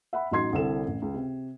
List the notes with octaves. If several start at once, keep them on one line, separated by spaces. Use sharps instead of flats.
E5 F#5 B5
A1 F#3 D#4 C6 G#6 C7
C2 D3 C4 E4 A4 E7
A1
C#2
C3